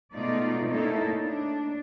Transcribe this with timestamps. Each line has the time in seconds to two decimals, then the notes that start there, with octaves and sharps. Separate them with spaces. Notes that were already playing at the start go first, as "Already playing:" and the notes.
0.12 B2 G#3 A3 D#4 F4 D5
0.68 A3 A#3 C#4 D#4 E4 A4
1.21 D4